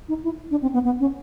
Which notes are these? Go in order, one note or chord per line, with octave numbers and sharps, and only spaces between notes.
D#4
E4
D4
C4
B3
B3
C#4